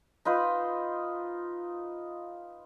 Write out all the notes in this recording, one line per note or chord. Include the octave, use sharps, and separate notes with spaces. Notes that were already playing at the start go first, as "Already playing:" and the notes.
D#4 F4 B4 C5